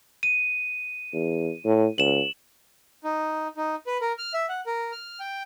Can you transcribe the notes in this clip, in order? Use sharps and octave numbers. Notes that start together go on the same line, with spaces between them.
D#7
E2
A2
C#2 E7 F#7
D#4
D#4
B4
A#4
F6
E5
F#5
A#4
F6
G5